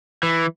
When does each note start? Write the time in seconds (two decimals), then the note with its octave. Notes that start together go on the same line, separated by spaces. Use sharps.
0.23 E3